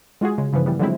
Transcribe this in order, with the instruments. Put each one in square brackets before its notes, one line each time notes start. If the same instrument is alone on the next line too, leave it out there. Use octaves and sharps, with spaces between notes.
[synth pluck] G#3 F4 F#4 G#4
C#3 G#3
G2 C#3 E3 F3 B3
E3 G3 B3
D3 F3 F#3 G#3 C4 E4